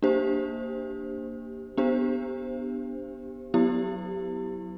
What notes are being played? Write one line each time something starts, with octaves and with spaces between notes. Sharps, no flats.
A#3 D4 G4 C5
B3 D4 G4 C5
F#3 B3 E4 G4